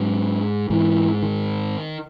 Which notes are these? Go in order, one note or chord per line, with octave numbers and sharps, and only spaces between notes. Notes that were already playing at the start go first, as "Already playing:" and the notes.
Already playing: G#2 F#3
G#2 E3
D#3